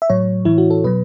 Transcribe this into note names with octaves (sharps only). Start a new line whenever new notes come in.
E5
A2 F#3 C#5
A2 E3 E4
F#4
A4
B2 F#3 B4